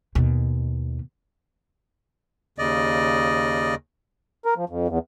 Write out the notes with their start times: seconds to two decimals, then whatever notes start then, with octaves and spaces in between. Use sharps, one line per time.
0.15 D#2 B2
2.58 D#2 C#3 D5 D#5
4.45 A#4
4.57 F3
4.69 F2
4.88 E2